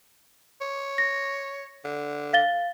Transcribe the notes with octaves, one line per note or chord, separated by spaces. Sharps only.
C#5
A#6
D3
F5 A6 G7